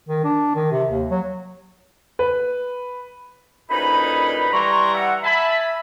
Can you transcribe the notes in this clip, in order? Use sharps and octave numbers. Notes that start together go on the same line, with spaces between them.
D#3
D4
D#3
C3
D#2
F#3
B4
D2 A#2 C#4 D#4 B4 B5
E3 G3 A#5 C6 C#6
E5 F#5
E5 G#5 A5 B5